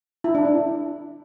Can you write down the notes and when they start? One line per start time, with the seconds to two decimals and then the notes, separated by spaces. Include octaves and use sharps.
0.24 E4
0.35 D4
0.45 D4